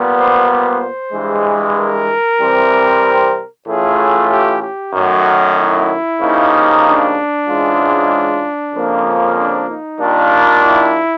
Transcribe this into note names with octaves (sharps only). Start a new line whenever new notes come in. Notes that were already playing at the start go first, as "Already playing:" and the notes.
Already playing: A#2 G3 B3
C5
C5
G2 E3 G#3
A#4
C3 E3 G3 C4
A2 E3 A3 C#4 F4 G#4
G4
G4
F#2 D#3 F#3 A3 F#4
E4
C#3 F3 A#3 D#4 G4
D4
G#2 E3 G#3 C#4 F4
F2 C#3 F3 A#3
D4
D#4
D#3 G3 A#3 D4 F4
E4